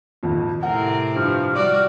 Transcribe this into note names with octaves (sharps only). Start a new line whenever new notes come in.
G#1 F2 A#2
A2 C3 C4 A#4 F#5
G2 F3 F6
G3 F#4 D5 D6